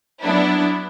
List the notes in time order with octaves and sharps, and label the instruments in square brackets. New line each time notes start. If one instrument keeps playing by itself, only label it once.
[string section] F#3 B3 D4 E4